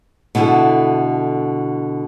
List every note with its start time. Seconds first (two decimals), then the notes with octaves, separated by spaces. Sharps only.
0.35 B2 D3 E4 A4